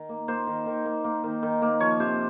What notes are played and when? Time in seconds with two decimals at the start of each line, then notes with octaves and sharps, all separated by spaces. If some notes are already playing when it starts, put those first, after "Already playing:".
Already playing: D#3
0.09 A#3
0.28 A#3 C5
0.47 D#3
0.66 D#3
0.85 A#3
1.04 A#3
1.24 D#3
1.43 D#3
1.62 A#3
1.80 F3 C#5
2.00 C3 C5